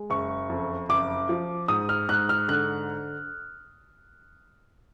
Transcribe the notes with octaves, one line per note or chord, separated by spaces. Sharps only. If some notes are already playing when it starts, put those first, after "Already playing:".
Already playing: G#3
F#1 C#6
F2
F#1 D6
F3
G#2 D#6
F6
G#2 F#6
F6
D3 F#6